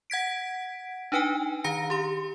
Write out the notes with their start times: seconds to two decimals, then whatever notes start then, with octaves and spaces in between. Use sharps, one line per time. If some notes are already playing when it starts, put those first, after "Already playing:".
0.10 F#5 G#6 B6 D7
1.12 D4 D#4 B4 G5 G#5
1.64 D#3 F5 A#5 A#6 C#7
1.90 G4 C6